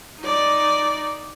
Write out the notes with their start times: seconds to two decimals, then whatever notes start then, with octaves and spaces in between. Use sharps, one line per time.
0.21 D#4 D5